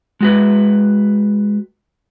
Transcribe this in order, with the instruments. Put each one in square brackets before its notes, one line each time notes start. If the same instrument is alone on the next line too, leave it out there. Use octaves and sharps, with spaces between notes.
[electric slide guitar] G#3 F#4 B4